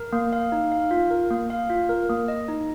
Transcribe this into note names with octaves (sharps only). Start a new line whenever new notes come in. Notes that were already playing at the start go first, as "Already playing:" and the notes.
Already playing: A#4
A#3
F5
D#4
F5
F4
A#4
A#3
F5
F4
A#4
A#3
D#5
D#4